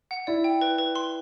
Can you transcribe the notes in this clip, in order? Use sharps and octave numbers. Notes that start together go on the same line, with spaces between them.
F#5
E4 D5
G5
B4
B4
C6